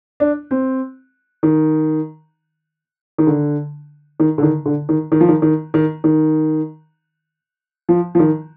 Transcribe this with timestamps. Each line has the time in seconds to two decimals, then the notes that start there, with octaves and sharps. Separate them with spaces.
0.20 D4
0.51 C4
1.43 D#3
3.18 D#3
3.27 D3
4.20 D#3
4.38 D3
4.43 D#3
4.66 D3
4.89 D#3
5.12 D#3
5.21 F3
5.29 D#3
5.42 D#3
5.74 D#3
6.04 D#3
7.89 F3
8.15 F3
8.19 D#3